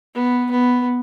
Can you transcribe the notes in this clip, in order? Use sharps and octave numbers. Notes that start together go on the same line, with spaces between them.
B3
B3